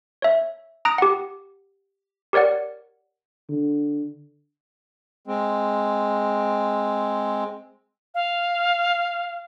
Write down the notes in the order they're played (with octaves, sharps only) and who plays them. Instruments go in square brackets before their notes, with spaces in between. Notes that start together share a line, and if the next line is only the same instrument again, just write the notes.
[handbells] C#5 E5
A#5 D#6 F#6 A#6 D7
G4 F#5
G4 A#4 C#5 D5 F#5
[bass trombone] D3
[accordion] G#3 C4
[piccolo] F5